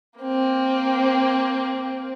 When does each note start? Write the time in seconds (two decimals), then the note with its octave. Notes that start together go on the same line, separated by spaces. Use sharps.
0.20 A#3 C4